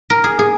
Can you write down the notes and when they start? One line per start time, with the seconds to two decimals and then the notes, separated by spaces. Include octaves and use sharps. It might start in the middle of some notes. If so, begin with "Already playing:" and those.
0.10 A#4
0.24 G#4
0.39 G#4